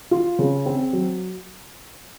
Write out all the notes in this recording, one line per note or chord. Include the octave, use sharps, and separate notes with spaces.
F4
C#3
C4
F#3